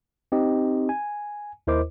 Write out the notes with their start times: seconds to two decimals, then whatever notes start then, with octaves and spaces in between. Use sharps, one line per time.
0.32 C4 D#4 G4 D#5
0.89 G#5
1.67 D#2 E4 A#4 C5 D#5 D6